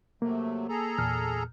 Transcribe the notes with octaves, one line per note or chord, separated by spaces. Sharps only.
C3 F#3 A3 A#3
G#4 A4 A#5
E2 A#2 F6